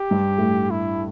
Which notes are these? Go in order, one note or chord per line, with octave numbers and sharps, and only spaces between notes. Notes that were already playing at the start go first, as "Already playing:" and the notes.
Already playing: G4
G2
A2
E4